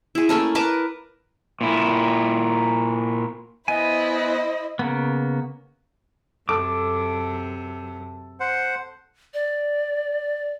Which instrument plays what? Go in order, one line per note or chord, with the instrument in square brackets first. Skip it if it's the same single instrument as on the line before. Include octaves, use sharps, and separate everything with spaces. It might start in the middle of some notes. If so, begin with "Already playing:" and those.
[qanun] E4 G#4
A3 A#3 C#4 A4
A#4 B4 A5 D6
[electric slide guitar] A#2 E4
[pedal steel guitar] B3 G#5 [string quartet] E4 C5 [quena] D#5
[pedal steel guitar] C#3 A#3 B3
[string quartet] F#2 C3 [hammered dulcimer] A4 [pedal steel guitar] D6
[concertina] C5 F#5
[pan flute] D5